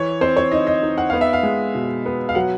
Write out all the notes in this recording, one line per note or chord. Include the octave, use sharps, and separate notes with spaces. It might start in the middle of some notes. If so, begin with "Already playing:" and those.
Already playing: E3 C#5
C4 C5
C#5
D#4 D#5
D#5
D#4
F#5
B3 F5
E5
F5
G#3
B2
B3
F5
F#3 F#5